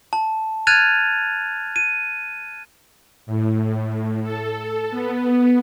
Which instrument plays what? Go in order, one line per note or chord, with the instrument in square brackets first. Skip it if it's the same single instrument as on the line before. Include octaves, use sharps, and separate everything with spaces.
[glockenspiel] A5
F6 F#6 G#6 A6 D#7 F7
D#7
[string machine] A2
A4
B3